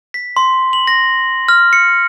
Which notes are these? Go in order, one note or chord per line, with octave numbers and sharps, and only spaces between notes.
B6
C6
F#7
A#6
F6
C#7